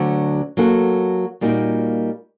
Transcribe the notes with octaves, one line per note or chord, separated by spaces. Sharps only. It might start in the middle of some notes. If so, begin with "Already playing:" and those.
Already playing: D2 D3 F#3
F#3 A#3 F#4 A4
A#2 G3 A#3 D#4 F#4